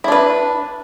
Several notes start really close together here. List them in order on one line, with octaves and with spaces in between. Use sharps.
E4 D4 B4